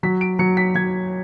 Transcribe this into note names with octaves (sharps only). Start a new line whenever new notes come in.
F#3 B6
D7
F#3 C#7
B6
F#3 G#6